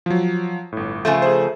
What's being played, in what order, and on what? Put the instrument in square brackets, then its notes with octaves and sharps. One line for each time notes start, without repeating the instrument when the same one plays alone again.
[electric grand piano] F3 F#3
G1 A2
[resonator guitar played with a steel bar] C#3 F3 A3 [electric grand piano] G6
[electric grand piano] G#4 C5